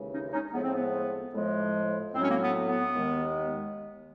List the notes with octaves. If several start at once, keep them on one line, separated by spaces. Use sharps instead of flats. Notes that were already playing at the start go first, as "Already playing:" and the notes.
Already playing: D#2 C#3 E3 G#3
C#4 D#4
C#4 D#4
A2 F3 G#3 B3
C4
B3
A2 F3 G#3
A2 F#3 C4 C#4
A#3 C4
B3
B3
D#2 D#3 G#3